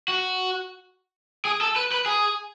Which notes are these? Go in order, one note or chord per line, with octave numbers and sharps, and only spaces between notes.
F#4
G#4
A4
B4
B4
G#4